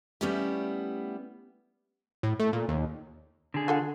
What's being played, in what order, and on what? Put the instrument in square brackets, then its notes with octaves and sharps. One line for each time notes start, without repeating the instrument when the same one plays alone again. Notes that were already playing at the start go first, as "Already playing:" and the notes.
[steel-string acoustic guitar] G3 A3 B3 C#4 E4 G4
[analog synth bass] A2
A3
A#2
D#2
[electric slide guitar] D3 G#4
[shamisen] F4 A4 F#5